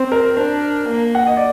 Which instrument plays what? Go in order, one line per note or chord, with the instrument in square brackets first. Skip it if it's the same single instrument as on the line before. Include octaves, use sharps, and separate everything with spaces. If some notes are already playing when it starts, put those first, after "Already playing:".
Already playing: [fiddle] C4 [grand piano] C5
[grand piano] A#4
[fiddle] D4 [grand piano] C5
[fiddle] A#3
[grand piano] F#5
D#5
D5